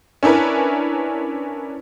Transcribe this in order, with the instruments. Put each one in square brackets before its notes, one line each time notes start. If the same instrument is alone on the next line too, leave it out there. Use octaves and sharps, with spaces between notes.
[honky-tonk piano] C#4 D4 E4 A#4 B4